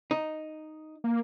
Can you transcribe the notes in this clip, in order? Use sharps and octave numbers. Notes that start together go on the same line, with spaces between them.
D#4
A#3